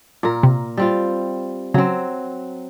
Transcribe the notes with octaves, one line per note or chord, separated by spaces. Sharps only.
A#2 A#4
C3
G3 C4 F4
C#3 F#3 C4 C#4